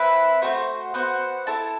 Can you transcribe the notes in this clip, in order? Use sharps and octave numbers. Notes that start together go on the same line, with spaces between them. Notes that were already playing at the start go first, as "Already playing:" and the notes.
Already playing: C4 E4 B4 E5
A3 C4 F#4 C5
B3 F#4 C5 F#5
E4 A4 E5 A5